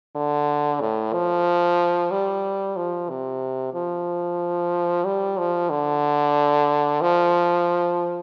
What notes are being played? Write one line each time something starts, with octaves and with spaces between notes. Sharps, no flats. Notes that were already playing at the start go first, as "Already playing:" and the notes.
D3
A2
F3
G3
F3
C3
F3
G3
F3
D3
F3